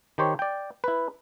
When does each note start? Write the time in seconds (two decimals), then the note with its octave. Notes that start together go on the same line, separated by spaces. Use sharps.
0.18 D#3 G4 C5 C#5
0.39 D5 G5
0.84 E4 B4